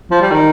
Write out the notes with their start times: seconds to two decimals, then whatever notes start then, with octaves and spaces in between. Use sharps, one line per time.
0.11 F3
0.21 G3
0.32 D#3